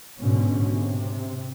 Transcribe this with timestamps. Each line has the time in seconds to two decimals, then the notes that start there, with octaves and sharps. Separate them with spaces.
0.19 G#2 B2 D3 C#4
0.70 C3